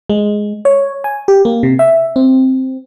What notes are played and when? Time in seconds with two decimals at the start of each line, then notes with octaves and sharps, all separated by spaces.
0.10 G#3
0.65 C#5
1.04 G#5
1.28 G4
1.45 A#3
1.63 C3
1.79 E5
2.16 C4